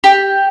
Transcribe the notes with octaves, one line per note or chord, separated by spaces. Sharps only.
G4